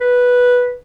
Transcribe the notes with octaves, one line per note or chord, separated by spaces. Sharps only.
B4